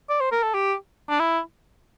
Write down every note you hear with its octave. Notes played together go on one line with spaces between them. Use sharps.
D5
C5
A#4
A4
G4
D4
E4